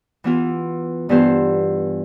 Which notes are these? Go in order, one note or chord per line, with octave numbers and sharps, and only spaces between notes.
E3 B3 F4
G2 E3 B3 F4 C5